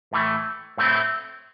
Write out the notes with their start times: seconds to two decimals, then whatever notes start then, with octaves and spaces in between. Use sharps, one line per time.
0.13 A2 E3 A3
0.77 A2 A3 C4 E4